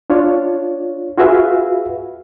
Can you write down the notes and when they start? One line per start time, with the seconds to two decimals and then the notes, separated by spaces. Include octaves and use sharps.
0.10 D4 F4 C#5
1.18 F4 F#4 G#4 B4 E5 F5